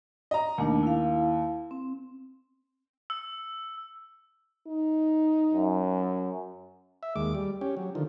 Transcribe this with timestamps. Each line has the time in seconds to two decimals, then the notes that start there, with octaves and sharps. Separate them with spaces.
0.31 D#5 A#5
0.58 D#2 A3 D4
0.83 E4 F5
1.71 C4
3.10 E6
4.67 D#4
5.54 F#2
7.03 E5
7.16 D#2 G#3 D6
7.35 G3
7.61 C#4 G4
7.77 F#3
7.95 D3 D#3 F3